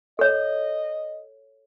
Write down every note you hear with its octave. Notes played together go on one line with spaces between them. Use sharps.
A4 C#5 D#5